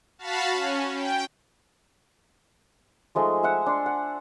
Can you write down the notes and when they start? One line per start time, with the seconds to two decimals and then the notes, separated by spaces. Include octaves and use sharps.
0.19 F#4 F5 A5 B5
0.51 C#4
0.94 G5
3.15 F3 G#3 A3 D#4
3.43 E5 F#5
3.66 D4 C6
3.86 F#5